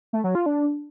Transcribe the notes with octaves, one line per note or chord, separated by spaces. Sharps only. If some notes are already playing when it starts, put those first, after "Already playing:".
A3
F#3
F4
D4